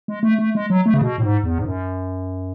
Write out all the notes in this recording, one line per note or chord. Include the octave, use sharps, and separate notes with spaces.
G#3
A3
A3
G#3
F#3
A3
C#3
B2
A2
G#2
E2
G#2
F#2